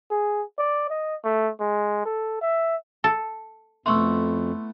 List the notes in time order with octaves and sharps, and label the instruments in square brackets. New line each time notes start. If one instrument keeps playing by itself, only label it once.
[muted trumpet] G#4
D5
D#5
A3
G#3
A4
E5
[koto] A4
[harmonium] F2 [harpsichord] A3 B3 E4 [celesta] C6 C#6 E6